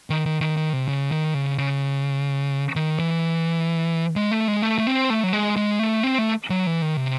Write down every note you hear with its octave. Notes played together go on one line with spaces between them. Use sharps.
D#3
D#3
D#3
D#3
C3
C#3
D#3
C#3
C#3
D#3
E3
G#3
A3
G#3
A3
A3
C4
A3
F#3
G#3
G#3
A3
C4
A3
F#3
E3
D#3
C3